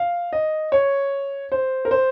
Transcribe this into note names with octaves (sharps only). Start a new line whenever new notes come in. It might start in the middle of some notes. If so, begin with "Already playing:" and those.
Already playing: F5
D#5
C#5
C5
A#4
C5